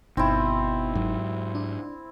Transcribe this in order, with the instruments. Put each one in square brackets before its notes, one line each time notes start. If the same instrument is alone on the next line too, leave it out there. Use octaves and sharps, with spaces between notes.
[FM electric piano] G1 D#4 [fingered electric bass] B2 [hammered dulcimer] C4 E4
[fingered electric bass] G#2 F#3
[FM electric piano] D4